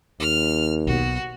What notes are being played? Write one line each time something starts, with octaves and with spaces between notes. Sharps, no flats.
D#2 F6
B1 B2 F#4